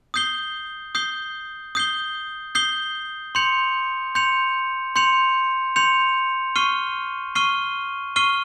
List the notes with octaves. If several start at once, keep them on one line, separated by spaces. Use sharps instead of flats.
D#6 G6 C7 G7
D#6 G6 C7 G7
D#6 G6 C7 G7
D#6 G6 C7 G7
C6 G6 C#7 F7
C6 G6 C#7 F7
C6 G6 C#7 F7
C6 G6 C#7 F7
C#6 F6 C7 D#7 G7
C#6 F6 C7 D#7 G7
C#6 F6 C7 D#7 G7